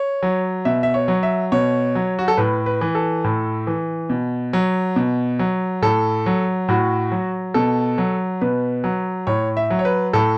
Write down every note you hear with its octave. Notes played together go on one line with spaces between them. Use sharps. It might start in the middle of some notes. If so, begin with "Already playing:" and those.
Already playing: C#5
F#3
B2 E5
E5
C#5
F#3
E5
B2 C#5
F#3
F#4
A4
A2 B4
B4
E3
A4
A2
E3
B2
F#3
B2
F#3
A2 A4
F#3
A2 F#4
F#3
B2 A4
F#3
B2 B4
F#3
A2 C#5
E5
F#3
C#5
B4
A2 A4